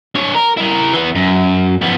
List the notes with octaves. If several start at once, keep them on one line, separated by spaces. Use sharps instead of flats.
D4 C#5
A#4
E4 A#4
E3 B3
F#2
F3 B3